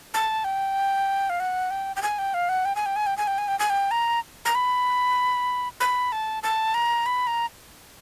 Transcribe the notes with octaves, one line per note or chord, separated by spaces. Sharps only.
A5
G5
F5
F#5
G5
G5
G#5
G5
F5
F#5
G5
G#5
G5
G#5
G5
G#5
G5
G#5
G5
G#5
G5
A#5
A#5
B5
B5
A5
A5
A#5
B5
A#5